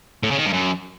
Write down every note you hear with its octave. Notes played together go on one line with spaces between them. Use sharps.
A2
C#3
D#3
G2
F#2